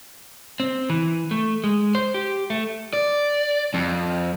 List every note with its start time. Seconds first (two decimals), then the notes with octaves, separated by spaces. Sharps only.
0.60 C4
0.90 E3
1.31 A3
1.64 G#3
1.95 C5
2.14 G4
2.50 A3
2.93 D5
3.74 F2